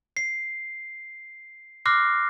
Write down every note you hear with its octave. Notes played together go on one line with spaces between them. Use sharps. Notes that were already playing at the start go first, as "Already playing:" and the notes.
C7
C6 D6 F6 F#6 A#6 C7